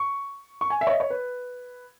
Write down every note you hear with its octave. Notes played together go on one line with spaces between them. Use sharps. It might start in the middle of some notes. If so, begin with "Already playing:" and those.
Already playing: C#6
C#6
G#5
E5
C#5
D#5
C#5
B4